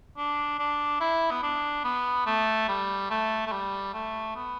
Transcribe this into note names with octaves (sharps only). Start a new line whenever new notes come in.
D4
D4
E4
B3
D4
B3
A3
G3
A3
A3
G3
A3
B3